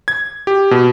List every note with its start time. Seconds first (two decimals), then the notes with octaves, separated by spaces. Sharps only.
0.08 G#6
0.47 G4
0.71 B2